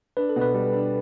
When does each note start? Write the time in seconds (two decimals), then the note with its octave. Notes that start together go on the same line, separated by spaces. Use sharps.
0.17 D4 B4
0.29 A4
0.36 B2
0.41 B4
0.54 G3
0.73 D4